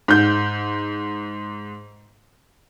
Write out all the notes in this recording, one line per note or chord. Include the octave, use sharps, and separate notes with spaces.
G#2 G6